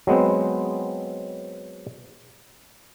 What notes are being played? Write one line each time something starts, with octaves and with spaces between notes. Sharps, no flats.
F#3 G#3 B3 C4